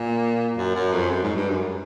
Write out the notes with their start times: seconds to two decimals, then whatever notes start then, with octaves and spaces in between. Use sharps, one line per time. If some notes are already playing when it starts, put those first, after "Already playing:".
Already playing: A#2
0.57 F#2
0.75 F#2
0.93 F2
1.10 F#2
1.23 G#2
1.36 G2
1.50 F#2